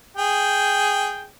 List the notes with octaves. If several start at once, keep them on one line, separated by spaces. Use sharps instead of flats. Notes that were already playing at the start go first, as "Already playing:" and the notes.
G#4 G5